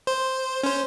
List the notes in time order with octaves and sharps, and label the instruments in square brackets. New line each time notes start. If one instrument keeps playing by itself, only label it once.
[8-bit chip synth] C5
C#4 C5